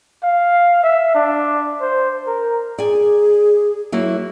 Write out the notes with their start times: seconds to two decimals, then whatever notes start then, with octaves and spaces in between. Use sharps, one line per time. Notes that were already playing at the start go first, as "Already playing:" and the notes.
0.23 F5
0.83 E5
1.15 D4
1.81 C5
2.27 A#4
2.78 G#4 D5 G#5
3.92 F#3 A#3 E4